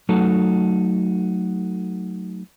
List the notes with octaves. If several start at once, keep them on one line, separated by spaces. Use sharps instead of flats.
F#3 A3 D#4 F#4 A4